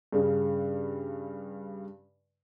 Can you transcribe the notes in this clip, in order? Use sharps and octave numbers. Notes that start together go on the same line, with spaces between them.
G2 C#3